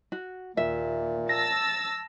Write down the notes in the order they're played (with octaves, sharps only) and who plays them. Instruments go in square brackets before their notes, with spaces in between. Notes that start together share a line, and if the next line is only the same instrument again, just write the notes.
[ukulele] F#4
[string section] D#2 [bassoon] A#2 [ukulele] E5
[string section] A5 E6 A6 [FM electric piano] A#6